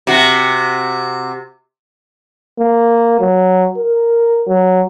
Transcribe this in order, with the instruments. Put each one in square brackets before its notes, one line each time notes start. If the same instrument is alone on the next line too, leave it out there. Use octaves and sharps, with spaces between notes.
[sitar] C3 F#4
[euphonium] A#3
F#3
A#4
F#3